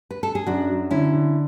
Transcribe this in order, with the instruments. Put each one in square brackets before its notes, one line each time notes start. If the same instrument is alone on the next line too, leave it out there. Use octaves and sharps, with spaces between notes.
[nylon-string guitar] B4
A4
G#4
[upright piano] F#2 [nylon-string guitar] D4 F#4
[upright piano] F#3
[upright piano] D3 [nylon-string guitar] C#4 E4
[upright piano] D3